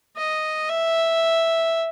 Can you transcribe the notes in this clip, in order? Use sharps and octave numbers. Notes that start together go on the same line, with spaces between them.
D#5
E5